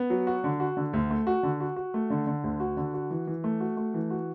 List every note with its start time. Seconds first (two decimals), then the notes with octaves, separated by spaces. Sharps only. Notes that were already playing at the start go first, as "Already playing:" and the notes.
Already playing: B3
0.10 F#3
0.27 F#4
0.44 D3
0.60 F#4
0.77 D3
0.93 D2
1.10 A3
1.27 F#4
1.43 D3
1.60 F#4
1.76 F#4
1.94 A3
2.10 D3
2.27 D3
2.44 D2
2.60 F#4
2.77 D3
2.94 F#4
3.11 E3
3.27 E3
3.44 A3
3.60 F#4
3.77 A3
3.94 E3
4.11 F#4